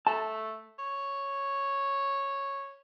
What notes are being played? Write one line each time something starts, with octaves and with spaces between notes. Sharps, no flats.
A3 A5
C#5